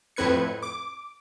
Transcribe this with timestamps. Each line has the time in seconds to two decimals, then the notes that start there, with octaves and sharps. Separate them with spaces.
0.16 F2 A2 C4 B4 G#6 C#7
0.63 D6